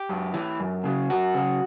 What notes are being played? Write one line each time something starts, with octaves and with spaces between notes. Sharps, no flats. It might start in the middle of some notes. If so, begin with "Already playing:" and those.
Already playing: G4
F#2
E3
F#2
C#3 F#3
F#2 F#4
C#3 F#3